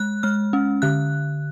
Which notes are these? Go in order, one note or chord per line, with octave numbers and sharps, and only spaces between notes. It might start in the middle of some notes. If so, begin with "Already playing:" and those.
Already playing: G#3 F#6
G#3 F6
C#4
D3 F#6